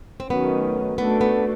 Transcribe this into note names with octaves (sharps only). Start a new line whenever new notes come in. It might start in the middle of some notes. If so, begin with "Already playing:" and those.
C4
D#3 F#3 A3 B3 C#4
A3 B3 D4 F#4 A4
B3